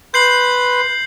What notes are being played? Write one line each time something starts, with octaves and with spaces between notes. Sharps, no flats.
B4 C6 G6 C7 F#7